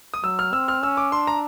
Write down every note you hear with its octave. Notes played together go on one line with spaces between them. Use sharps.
D#6
F#3 E6
F6
C4 E6
F6
C#4 E6
D6
D4 C6
A#5